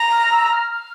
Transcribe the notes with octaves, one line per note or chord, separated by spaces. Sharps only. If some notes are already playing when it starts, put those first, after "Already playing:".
Already playing: A#5
F6
E6
F6
F6